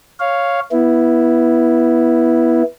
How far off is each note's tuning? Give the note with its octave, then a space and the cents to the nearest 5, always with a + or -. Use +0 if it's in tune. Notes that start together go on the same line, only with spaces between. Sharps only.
C#5 +0 F5 +0
B3 -15 E4 +0